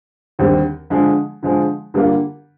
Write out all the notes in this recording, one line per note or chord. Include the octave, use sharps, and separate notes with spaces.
D#2 D3 G3 C4
D3 F3 G#3
D3 F3 G#3
D3 G3 A#3 F4